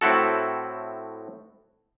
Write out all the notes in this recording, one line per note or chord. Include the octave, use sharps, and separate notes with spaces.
A2 C4 E4 F#4 A4